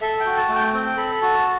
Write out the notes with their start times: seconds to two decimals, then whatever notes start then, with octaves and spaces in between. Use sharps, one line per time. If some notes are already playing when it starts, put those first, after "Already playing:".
0.01 A4 E5
0.20 G5
0.26 F#4
0.37 A5
0.49 A3
0.55 G5
0.73 C4 G5
0.97 A4 B5
1.22 F#4 A5